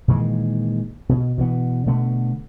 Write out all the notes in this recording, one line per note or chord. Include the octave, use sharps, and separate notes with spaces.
A#2 D#3 E3 G#3
B2
B2 E3 B3
B2 D3 A3 B3